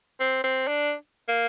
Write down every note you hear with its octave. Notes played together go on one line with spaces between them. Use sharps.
C4
C4
D4
A#3